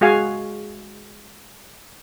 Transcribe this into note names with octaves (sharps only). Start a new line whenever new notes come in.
G#3 F#4 G#4 F5 G#5